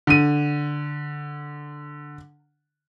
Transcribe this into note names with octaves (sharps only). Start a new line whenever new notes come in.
D3 D#7